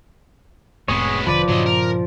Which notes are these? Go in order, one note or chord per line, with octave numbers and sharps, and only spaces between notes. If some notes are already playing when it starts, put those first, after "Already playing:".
F1 A2 G#3 B3 C4 G#4 C#5
E1 D3 F3 B4 D5
G2 A#2 C#3 F#3 D#5
A#4